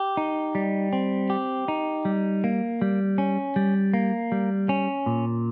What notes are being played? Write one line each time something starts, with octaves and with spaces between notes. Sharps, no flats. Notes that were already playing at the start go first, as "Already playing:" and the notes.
Already playing: G4
D#4
G3
C4
G4
D#4
G3
A#3
G3
C#4
G3
A#3
G3
C#4
A#2